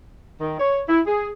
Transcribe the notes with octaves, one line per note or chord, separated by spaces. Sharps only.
D#3
C#5
E4
G#4